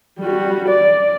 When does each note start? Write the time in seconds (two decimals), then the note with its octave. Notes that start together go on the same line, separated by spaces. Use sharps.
0.19 G3 F#4
0.68 D5